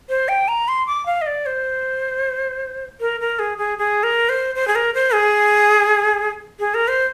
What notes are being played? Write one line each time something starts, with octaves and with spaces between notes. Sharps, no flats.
C5
G5
A#5
C6
D6
F5
D#5
D5
C5
A#4
A#4
G#4
G#4
G#4
A#4
C5
C5
G#4
A#4
C5
G#4
G#4
A#4
C5